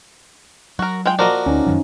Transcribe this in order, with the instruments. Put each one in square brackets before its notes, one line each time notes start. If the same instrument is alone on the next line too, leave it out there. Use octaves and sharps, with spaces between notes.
[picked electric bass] F#3 [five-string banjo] F#4 A#4
[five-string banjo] G#3 F4 G5
[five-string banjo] F3 A#3 D#5 [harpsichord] F#4 A#4 D5
[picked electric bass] D2 [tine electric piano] C#4 D#4
[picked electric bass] F#2 D#3 F#3